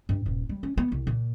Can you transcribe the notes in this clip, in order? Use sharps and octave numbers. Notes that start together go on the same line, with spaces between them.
G2
D#1
G3
C#4
B3
C2
A#2